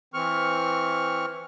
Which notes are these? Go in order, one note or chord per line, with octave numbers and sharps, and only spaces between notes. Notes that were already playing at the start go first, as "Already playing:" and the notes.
E3 C4 C#6 F6